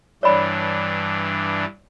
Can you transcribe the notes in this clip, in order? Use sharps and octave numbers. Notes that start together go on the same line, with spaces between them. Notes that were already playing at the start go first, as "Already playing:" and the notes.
G2 E3 D4 C#5 D5 B5